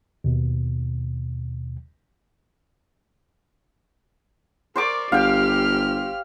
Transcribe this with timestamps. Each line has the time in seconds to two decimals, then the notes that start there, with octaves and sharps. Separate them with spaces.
0.24 D#2 B2
4.76 A#4 C5 D5 C#6 D6
5.12 G1 G4 F5 G5 F6